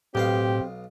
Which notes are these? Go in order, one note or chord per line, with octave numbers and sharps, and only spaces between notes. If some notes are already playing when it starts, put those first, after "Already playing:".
B1 A2 B3 C4 G4 F5